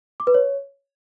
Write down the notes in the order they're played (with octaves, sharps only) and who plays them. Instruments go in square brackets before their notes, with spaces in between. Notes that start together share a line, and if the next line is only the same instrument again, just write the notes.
[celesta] D6
B4
C#5